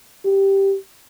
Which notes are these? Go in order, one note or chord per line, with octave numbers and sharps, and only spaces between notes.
G4